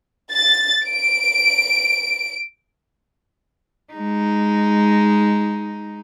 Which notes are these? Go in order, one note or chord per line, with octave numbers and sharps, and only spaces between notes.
A6
D7
G#3 D#4